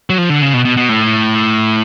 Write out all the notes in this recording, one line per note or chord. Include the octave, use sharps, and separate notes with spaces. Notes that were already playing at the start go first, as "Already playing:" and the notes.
F#3
F3
D3
C#3
B2
B2
B2
A2